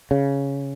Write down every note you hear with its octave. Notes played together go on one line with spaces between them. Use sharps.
C#3